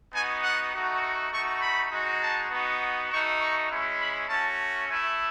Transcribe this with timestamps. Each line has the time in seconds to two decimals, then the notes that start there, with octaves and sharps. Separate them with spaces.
0.13 B3 D#4 F#4 G#5
0.43 F#5
0.73 A3 D#4 F#4
1.32 A3 D#4 F#4 C#6
1.62 B5
1.91 G#3 D#4 F#4
2.22 A5
2.50 B3 D#4 F#4
2.80 C#6
3.10 A3 D#4 F#4 C#6
3.40 C#6
3.70 G#3 C#4 E4
3.99 B5
4.29 A3 C#4 F#4 A5
4.88 A3 E4 G#5